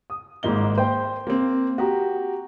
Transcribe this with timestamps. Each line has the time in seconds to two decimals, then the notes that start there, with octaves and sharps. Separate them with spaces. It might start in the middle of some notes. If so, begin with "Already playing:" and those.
0.10 D#6
0.43 G#1 G#2 A#3 D#4 G7
0.78 C5 G5
1.27 A#3 C4
1.78 F#4 G4 A#5